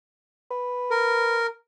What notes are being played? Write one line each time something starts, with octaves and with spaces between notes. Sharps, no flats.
B4
A#4